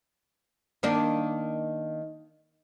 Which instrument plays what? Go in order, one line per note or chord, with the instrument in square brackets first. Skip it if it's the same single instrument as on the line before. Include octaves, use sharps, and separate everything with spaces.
[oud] D#3 A#3 D4